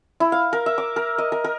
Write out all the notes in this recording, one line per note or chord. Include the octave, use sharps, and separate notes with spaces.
E4
F5
A#4
E5
D6
A#4
D#5
A#4
A#4